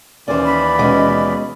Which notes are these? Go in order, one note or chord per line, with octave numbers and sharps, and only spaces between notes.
D#2 E3 C#4 C5 D5
B5
B2 G#3 C#4